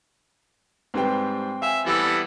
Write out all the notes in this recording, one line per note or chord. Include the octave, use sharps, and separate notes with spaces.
G#2 G3 C4 B4 G5
E5 F5 G#5
E3 G3 B3 A4